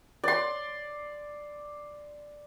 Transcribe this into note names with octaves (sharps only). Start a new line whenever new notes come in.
D5 C6